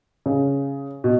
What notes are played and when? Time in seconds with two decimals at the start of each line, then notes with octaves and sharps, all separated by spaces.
0.26 C#3
1.04 B2